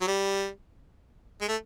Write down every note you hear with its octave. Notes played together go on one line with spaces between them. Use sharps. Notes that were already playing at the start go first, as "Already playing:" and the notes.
F#3
G3
G#3
A3